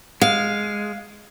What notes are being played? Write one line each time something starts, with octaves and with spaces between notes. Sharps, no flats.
G#3 F5